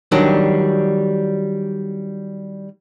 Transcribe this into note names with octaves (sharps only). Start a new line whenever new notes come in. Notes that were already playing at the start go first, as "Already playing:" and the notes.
D#3 F#3 G3 D4